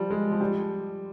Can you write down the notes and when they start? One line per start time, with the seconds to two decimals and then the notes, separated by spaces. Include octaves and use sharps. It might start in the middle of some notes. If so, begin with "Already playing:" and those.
Already playing: F3 G3
0.10 G#3
0.31 F3
0.41 G3